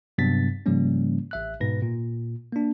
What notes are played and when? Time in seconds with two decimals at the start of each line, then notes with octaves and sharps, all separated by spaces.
0.18 G2 C3 F#3 B3 A6 B6
0.66 G#2 C#3 F3 G3 A#3 C#4
1.31 A1 E5 F#6
1.60 G#2 B2 B4 A#6
1.82 A#2
2.53 A#3 D4